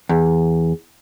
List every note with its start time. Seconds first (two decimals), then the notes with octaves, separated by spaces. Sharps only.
0.09 E2